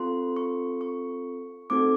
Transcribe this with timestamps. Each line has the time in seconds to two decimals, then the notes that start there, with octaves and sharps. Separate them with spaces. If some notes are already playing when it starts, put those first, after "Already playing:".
Already playing: C4 F4 A4 C6
0.36 C#6
0.81 C#6
1.70 A3 C4 D#4 F#4 A4 D6